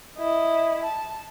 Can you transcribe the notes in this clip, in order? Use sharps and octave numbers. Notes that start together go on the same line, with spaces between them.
E4 D#5
A5